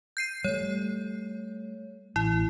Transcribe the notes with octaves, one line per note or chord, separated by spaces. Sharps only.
G6 C7 D#7
G3 A3 C#5
A1 E4